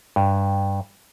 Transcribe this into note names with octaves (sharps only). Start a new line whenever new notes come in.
G2